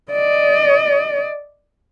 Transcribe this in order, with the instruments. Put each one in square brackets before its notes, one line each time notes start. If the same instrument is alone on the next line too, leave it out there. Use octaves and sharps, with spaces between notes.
[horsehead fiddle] D5 D#5